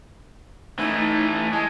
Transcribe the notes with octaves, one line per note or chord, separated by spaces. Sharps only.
E3 A3 D#4
G#3 A5